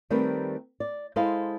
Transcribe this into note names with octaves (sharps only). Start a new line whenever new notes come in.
D#3 G3 A3 C4 A#4 B4
D5
G#3 E4 A4 C5 D#5 F5